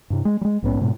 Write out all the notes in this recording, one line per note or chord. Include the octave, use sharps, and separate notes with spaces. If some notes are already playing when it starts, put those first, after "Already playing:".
G2 C3
G#3
G3 G#3
A#1 G#2 B3 C#4
G#2 B2